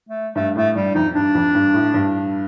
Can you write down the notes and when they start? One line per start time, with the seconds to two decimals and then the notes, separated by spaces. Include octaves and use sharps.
0.09 A3
0.35 G2 A3
0.55 A2 A3
0.75 G2 G3
0.94 F2 D#4
1.15 G2 D4
1.35 F2
1.55 G2
1.74 A2
1.94 G2